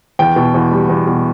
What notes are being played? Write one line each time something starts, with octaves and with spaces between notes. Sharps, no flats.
E2 G5
B2
E2
G3
E2
B2